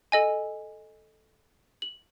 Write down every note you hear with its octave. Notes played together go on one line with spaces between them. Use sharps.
A4 D#5 G#5
F#7